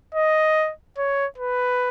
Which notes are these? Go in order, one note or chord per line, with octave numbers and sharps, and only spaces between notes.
D#5
C#5
B4